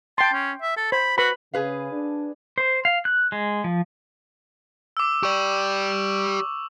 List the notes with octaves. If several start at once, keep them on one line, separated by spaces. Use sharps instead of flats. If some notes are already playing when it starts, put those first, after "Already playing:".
G5 A5 C6
C#4
E5
A4
C5 B5
F#4 B4 B5
C#3 G#4 B4 F5
D4
C5
F5
F#6
G#3
F3
D6 E6
G4 D5 C#6 F#7